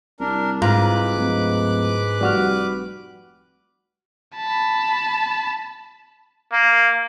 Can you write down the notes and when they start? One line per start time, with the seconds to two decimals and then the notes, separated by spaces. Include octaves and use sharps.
0.20 C2 D4 A#4
0.62 G#2 F4 B4 A#5 D6 F#6
1.16 D1
2.21 F1 G3 F#4 F6
4.36 A5 B5
6.52 A#3